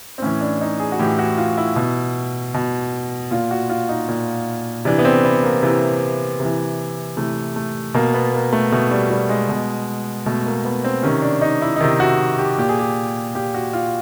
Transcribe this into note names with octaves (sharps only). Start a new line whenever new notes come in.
C4
A2 E3 C#4
D4
D#4
G#4
F#4
A2 E3 G4
F#4
F4
E4
B2
B2
A#2 F4
F#4
F4
D#4
A#2
C3 E3 D4
B3
C4
B3
A#3
C3 E3
C3
E3
C3 E3 A3
A3
B2 A#3
B3
A#3
A3
B2 A3
G3
G3
G#3
B2
B2 A3
A#3
B3
C4
C3 D#3 C#4
D4
D#4
E4
D#4
C3 D#3 E4
F#4
G4
A#2 G4
G#4
G4
A#2 G4
F#4
F4